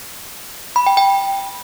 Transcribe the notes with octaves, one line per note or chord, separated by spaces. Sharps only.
B5
G5
G5